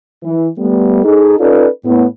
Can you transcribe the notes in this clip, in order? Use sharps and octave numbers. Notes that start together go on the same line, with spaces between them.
E3
G3 A3 B3
D#4 G#4 A4
C#4 D#4 F4 A4 B4 D5
A2 B3